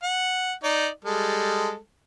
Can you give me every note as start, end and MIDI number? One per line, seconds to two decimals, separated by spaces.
0.03 0.53 78
0.64 0.88 63
0.64 0.88 74
1.05 1.76 55
1.05 1.76 56
1.05 1.76 69